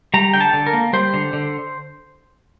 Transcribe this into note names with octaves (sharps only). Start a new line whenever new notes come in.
G3 A#5
D3 G5
A5
D3
A#4
A#3
G3 C5
D3
D3